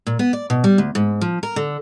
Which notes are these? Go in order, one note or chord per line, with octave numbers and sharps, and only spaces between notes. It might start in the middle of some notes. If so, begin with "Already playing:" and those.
A#2
B3
D5
B2
G3
D2
G#2
F3
A#4
D3